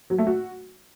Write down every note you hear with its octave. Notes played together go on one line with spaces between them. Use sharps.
F#3
A3
F#4